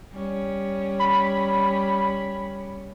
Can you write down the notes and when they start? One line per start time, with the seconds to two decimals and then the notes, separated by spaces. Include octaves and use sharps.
0.12 G3 C#4
1.00 B5